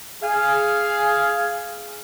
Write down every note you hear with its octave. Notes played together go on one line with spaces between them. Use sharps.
G#4 F5